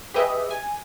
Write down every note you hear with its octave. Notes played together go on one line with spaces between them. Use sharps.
G4 G#4 B4 D#5 E5
G#5